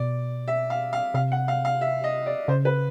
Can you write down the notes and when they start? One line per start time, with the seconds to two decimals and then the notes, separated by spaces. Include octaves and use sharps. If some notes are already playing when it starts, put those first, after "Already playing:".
Already playing: B2 D5
0.48 E5
0.70 F5
0.93 F5
1.14 C3 F5
1.32 F#5
1.48 F5
1.65 F5
1.81 E5
2.04 D#5
2.26 D5
2.48 C#3 C5
2.65 B4